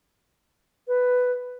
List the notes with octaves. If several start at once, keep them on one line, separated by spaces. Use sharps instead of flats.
B4